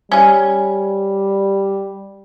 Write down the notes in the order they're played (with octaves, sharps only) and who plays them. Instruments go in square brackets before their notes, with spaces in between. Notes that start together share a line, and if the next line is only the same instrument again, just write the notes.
[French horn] G3 [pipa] C#4 G#5